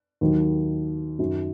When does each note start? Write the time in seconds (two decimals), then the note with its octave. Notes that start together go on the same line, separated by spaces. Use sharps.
0.21 D#2 D#3 F#3
1.19 F#2 D#3 F#3